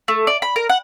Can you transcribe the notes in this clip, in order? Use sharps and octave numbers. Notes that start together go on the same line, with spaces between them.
A3
D5
B5
A#4
F#5